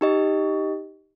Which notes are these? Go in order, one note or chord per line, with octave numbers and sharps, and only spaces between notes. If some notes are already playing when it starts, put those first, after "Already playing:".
D#4 G4 D#5